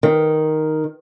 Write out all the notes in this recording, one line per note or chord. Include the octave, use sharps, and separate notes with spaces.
D#3